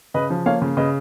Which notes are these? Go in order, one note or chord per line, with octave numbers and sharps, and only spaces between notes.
C#3 B4 D#5
F3
A#3 C#5 F5
C#3
C#3 B4 D#5